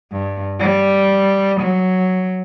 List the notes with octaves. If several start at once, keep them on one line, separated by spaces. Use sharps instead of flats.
G2
G3
F#3